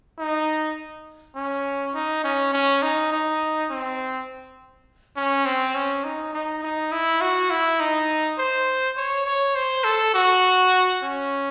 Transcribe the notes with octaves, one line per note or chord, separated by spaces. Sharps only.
D#4
C#4
D#4
C#4
C#4
D#4
D#4
C4
C#4
C4
C#4
D#4
D#4
D#4
E4
F#4
E4
D#4
C5
C#5
C#5
C5
A4
F#4
C#4